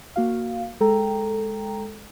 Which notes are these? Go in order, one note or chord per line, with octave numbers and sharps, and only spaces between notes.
A#3 F#4 F5
G#3 A4 G5 A#5